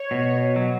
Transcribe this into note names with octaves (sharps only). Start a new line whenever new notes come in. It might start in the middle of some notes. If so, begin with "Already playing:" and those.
Already playing: C#5
B2
F#3